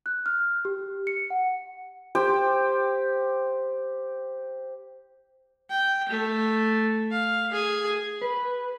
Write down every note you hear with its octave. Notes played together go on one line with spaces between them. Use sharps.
F#6
F6
G4
C#7
F#5
G4 C5 G5
G5
A3
F5
G#4
B4